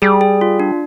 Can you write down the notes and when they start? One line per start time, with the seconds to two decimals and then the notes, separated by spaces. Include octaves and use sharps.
0.02 G3 G#4
0.21 G#4
0.41 F4
0.60 D4